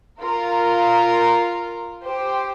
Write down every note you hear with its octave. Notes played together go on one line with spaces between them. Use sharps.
F4 A#4
G4 C5